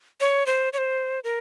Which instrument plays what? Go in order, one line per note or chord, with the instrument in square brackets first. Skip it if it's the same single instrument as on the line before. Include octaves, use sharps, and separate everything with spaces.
[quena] C#5
C5
C#5
C5
A#4